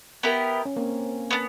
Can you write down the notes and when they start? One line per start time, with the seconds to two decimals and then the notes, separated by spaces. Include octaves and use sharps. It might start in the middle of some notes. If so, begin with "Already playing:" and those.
0.23 B3 E4 G4 A#4
0.65 C#4
0.76 A#3 C4
1.31 B3 D4